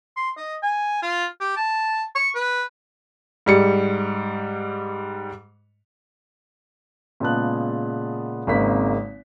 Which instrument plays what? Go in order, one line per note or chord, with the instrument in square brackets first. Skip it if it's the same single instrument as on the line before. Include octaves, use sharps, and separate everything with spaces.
[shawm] C6
D#5
G#5
F4
G4
A5
C#6
B4
[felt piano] G#2 G3 C#7
[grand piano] A#2 C#3 G#3 B3 A5 F#6
G#1 C#3 G#3 A#3 C4 B6